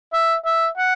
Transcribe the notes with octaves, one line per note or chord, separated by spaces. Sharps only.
E5
E5
F#5